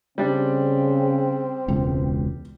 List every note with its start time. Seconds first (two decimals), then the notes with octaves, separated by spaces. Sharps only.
0.18 C#3 G3 C4 D4
1.68 E1 C#2